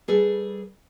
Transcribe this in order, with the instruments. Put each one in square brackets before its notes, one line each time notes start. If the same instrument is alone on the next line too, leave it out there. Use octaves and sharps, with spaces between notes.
[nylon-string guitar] G3 G#4 A4 B4